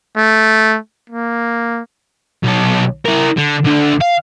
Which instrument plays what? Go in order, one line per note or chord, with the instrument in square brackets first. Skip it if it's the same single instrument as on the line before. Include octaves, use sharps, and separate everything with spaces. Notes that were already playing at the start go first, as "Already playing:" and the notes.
[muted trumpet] A3
A#3
[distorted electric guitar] B1 A4
E4 A#4
D3
D2 D3
F5